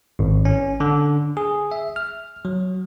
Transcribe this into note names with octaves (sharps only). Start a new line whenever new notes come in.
G#1
C#4
D3
G#4
E5
F6
F#3